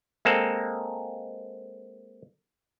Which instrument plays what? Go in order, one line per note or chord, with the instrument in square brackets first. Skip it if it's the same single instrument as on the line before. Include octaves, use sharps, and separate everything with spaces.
[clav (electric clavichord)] G#3 A#3 C4 A4